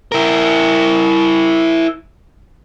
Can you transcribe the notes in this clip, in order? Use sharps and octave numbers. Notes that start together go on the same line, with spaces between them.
E4 A#4